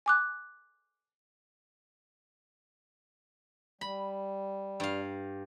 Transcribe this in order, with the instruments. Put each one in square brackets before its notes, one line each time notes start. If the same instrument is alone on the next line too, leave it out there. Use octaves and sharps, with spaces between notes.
[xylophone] G#5 D6 F#6
[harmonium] G3 [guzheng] B5
[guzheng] G2 F5